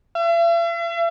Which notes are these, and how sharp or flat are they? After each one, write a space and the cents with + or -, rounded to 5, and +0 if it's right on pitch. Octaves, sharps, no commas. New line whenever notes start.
E5 +45